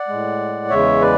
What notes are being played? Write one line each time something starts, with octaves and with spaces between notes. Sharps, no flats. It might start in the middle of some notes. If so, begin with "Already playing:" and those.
Already playing: D5 F#5
A2 G#3
E2 C#3 G#3 C#5 E5
B4 D5